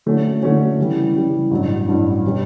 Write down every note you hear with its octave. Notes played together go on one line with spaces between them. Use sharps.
D3 A3 C#4 F#4
D3 A3 C#4 F#4
C#3 E3 G3
C#3 E3 G3
A1 G2 F#3
A1 G2 F#3
B2 G3 C#4